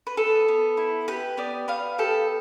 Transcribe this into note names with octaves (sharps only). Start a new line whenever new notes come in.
B4
B3 A4
B3
E4
G4 B4
B3 D5
B3 F5
G4 A4